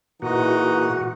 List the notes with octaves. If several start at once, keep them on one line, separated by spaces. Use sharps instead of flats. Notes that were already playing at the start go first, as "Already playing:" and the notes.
A#2 E3 G#3 D#4 F#4 F#5